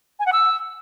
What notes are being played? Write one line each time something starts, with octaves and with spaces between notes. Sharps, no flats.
G#5
F#5
E6